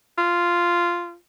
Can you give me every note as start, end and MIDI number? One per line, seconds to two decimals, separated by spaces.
0.18 1.16 65